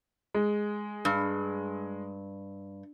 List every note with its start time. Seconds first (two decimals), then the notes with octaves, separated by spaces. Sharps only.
0.34 G#3
1.05 G2